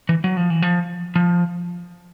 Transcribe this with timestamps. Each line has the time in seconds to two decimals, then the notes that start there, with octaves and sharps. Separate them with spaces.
0.09 E3
0.24 F#3
0.37 F3
0.50 E3
0.62 F3
1.16 F3